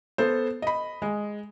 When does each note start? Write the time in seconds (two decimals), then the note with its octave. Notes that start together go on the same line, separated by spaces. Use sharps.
0.18 B3 A4 C5
0.62 D#5 B5
1.02 G#3